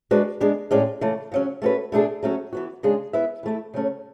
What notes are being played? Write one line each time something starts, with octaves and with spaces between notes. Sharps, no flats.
G#3 D4 F#4 B4 D5
G#3 B3 D4 G#4
A2 G#3 C#4 G#4 D5
C#3 E3 A3
C#3 F#3 C#4
A3 C#4 F#4 B4
B2 A3 D4 G#4
F#3 A3 C#4 F#4
E3 B3 F#4
C#3 G#3 D4 G#4
B3 E4 B4 E5
E3 A3 E4
C#3 F#3 A3 C#4